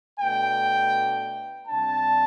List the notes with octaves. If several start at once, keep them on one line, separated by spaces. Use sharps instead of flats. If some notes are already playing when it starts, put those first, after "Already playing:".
B2 A3 D4 G5
C3 G3 D4 A5